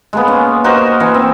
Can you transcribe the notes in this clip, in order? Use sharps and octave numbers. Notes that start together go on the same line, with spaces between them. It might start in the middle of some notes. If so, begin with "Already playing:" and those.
G#3 A#3 B3
C#4
F#4 A#4 C5 D#5
E3 C#4 C#5
C4